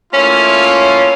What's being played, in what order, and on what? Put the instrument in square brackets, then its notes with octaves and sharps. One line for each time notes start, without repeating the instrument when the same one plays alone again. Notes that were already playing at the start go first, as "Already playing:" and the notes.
[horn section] A3 A#3 C#4 E4 F4